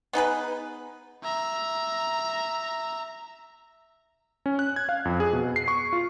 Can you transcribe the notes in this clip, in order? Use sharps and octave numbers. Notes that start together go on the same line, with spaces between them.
B3 D#4 G#4 B4
E5 A#5
C#4
F#6
G#6
F5
F2
G#4
B2
C7
C#6
F4